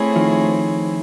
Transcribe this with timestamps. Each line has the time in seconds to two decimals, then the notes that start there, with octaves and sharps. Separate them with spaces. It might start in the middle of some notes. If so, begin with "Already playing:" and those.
Already playing: A3 C4 E4 G#4 C#5
0.16 D#3 F3